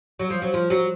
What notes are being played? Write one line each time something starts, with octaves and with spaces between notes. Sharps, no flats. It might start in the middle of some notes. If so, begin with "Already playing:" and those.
F#3
F3
F#3
F3
F#3